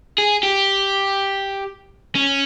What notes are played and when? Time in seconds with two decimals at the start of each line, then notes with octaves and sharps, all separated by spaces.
0.18 G#4
0.43 G4
2.15 C#4